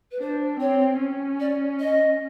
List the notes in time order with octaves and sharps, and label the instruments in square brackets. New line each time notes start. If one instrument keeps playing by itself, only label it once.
[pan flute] B4
[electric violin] D4 [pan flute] C5
[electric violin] C4 [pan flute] C#5
[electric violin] C#4
[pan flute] D5
D#5